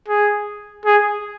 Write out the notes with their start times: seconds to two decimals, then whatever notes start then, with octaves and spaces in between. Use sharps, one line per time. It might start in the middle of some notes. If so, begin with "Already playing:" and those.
0.08 G#4
0.85 G#4